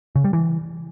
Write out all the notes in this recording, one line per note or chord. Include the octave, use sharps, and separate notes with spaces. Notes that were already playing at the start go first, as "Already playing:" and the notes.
C#3
G3
E3